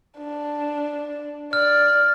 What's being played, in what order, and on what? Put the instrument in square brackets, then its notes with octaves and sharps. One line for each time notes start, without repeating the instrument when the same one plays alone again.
[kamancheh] D4
[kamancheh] D5 [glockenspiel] F6